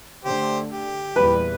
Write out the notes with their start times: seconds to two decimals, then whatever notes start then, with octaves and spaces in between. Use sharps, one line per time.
0.25 D3 A3 G4 C5
0.71 G4
1.16 E2 A#2 G3 B4